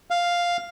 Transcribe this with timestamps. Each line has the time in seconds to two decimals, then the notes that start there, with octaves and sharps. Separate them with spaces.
0.10 F5